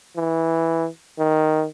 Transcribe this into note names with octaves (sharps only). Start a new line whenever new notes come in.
E3
D#3